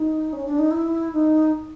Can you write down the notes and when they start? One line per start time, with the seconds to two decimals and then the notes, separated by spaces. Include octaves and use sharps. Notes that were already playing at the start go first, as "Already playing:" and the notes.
Already playing: D#4
0.33 C#4
0.45 D4
0.59 D#4
0.71 E4
1.13 D#4